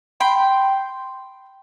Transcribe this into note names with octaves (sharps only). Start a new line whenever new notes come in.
G5 B5 C6